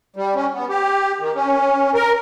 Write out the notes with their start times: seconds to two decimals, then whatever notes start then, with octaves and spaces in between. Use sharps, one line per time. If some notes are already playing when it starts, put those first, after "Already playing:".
0.16 G3
0.35 C#4
0.53 B3
0.69 G4
1.20 D#3
1.35 C#4
1.94 A#4